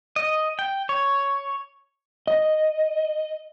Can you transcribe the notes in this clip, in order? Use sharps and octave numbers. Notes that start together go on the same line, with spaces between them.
D#5
G5
C#5
D#5